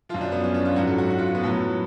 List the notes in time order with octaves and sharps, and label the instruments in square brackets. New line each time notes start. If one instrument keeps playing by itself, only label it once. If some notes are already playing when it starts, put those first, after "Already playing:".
[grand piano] F3 F4
F#2
D4
B3
C#4
D4
F4
G#2 F#3 F#4
A4
F#4
F#4
F4
B3
A2 F#3